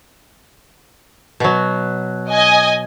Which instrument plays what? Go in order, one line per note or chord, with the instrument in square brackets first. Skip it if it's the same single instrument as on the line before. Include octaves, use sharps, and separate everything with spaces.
[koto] B2 F#3
[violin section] D#5 G#5